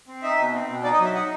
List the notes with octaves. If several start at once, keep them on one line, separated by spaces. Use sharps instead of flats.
C4
D#4 E5
B2
C4
B2
D#4 D5
D#5
F#3
E5
D#4 F#5